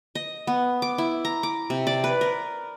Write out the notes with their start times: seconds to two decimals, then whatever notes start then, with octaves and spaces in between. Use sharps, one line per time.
0.15 D#5
0.47 B3
0.82 D6
0.98 E4
1.25 A#5
1.43 D6
1.70 C3
1.87 D5
2.04 B4
2.21 A#4